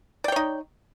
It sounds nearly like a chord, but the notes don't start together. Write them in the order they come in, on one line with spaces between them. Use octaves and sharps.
D5 G5 C#5 D#4